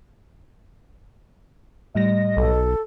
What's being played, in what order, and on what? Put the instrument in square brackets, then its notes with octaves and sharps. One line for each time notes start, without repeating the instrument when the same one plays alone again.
[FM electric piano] A2 G3 A#6 [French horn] D#5
[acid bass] B1 [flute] A4